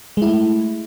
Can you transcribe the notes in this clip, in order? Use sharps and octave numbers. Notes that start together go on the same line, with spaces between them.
G#3 A3 E4